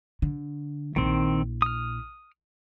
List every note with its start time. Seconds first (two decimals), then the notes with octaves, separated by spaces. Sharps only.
0.22 D3
0.96 A#1 D#3 C4 E4
1.62 D#6 F6